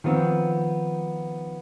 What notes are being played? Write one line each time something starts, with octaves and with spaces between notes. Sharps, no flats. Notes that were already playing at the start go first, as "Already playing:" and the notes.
D#3 F3 B3 C4